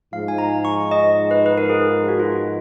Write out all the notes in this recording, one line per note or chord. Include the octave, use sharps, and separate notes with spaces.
G#2 F3 G#3 D#4 F5
G#5
A#5
C#6
D#5
B4
B4
A#4
G#4
F#4
F4
F#4